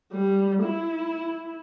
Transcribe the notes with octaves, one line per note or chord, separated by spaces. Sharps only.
G3
E4